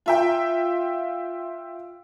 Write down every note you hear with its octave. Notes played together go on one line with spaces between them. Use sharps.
F4 E5 G5